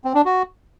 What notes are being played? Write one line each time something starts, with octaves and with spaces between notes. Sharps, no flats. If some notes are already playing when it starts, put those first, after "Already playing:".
C4
D4
F#4